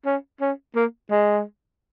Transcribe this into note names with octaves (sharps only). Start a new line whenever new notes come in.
C#4
C#4
A#3
G#3